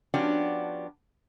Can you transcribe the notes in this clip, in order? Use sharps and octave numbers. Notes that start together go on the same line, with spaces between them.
F3 B3 C#4 D4 F#4 G4